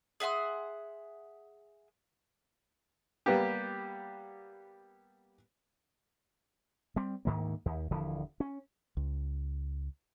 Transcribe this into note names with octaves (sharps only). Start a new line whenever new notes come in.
G#4 E5 F#5 C6
G3 A#3 B3 G4
G3 C4
D2 G#2 D#3 A#3
D#2
D#1 D3 E3 F3
C#4
C#2